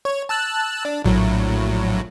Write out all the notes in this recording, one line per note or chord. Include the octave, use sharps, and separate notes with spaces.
C#5
A5 E6 F#6
D4
A#1 A2 F#3